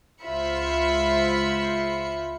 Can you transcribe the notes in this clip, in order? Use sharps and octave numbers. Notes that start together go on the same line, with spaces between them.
C#2 F4 C5 E5 B5 C#7